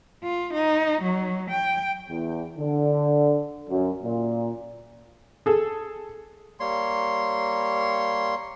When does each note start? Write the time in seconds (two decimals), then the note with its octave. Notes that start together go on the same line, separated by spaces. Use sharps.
0.23 F4
0.54 D#4
1.02 F#3
1.50 G5
2.10 E2
2.58 D3
3.70 F#2
4.03 A#2
5.46 G#4 A4
6.60 G3 A#3 C#5 C6